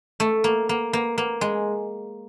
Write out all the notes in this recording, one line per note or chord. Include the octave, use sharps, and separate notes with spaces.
A3
A#3
A#3
A#3
A#3
G#3